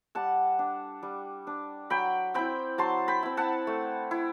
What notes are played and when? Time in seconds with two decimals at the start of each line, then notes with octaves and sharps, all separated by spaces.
0.15 G3 F#5 A5
0.59 D4
1.03 G3
1.47 D4
1.90 F#3 G5 B5
2.34 C4 E4 G5 B5
2.78 F#3 A5 C6
3.08 G5 B5
3.23 C4 E4
3.37 F#5 A5
3.67 A3
4.11 E4